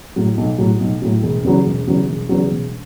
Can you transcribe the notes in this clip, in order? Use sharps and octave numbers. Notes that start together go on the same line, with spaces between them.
A2 F#3
B1
A2 F#3
B1
A2 F#3
E1
E2 C#3 F#3
E1
E2 C#3 F#3
E1
E2 C#3 F#3
E1